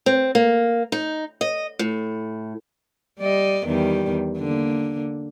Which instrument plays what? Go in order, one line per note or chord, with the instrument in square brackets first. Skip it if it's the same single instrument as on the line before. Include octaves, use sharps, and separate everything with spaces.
[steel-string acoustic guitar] C4
A#3
D#4
D#5
A2
[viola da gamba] G3 D5 D#5
E2 D#3 G3
D3 A#3